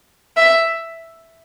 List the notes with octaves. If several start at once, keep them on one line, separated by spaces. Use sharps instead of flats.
E5